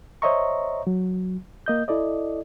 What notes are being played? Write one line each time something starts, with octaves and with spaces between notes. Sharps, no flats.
C5 C#5 D#5 E5 A#5 C#6
F#3
A#3 D#5 G6
E4 A4 D5 D#5